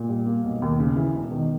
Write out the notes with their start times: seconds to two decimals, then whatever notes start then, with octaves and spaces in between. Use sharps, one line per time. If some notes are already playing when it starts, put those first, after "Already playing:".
Already playing: A#2
0.09 G3
0.26 A#3
0.44 B1
0.62 D#2
0.79 C#3
0.96 E3
1.15 E1
1.31 D#3